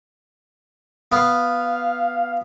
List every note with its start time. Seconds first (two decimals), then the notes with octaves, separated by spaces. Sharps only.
1.12 B3 F5